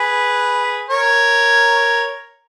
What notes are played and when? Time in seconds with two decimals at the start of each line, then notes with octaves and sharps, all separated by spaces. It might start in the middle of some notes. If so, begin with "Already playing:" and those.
Already playing: G#4 B4
0.90 A#4 C#5